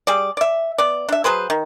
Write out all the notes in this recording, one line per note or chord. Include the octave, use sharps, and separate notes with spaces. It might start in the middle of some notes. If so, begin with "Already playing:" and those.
G3 G#4 D5
D5 E5
B3 D5
D4 E5
F#3 G#4 B4 C5
D#3